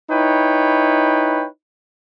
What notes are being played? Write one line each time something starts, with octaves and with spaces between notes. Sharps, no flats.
D#4 E4 B4 C#5 G5